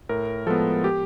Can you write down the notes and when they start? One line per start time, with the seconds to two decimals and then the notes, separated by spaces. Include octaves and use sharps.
0.09 A2 A#4
0.47 F3 G#3 B3 A4
0.84 G4